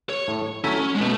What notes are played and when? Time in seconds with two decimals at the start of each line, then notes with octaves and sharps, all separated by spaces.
0.10 C#5
0.28 A2
0.64 F#3 A3 C#4 E4
0.95 G#3
1.01 B2 A3